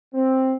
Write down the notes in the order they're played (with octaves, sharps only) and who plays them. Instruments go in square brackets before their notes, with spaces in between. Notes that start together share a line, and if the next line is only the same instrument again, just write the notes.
[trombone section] C4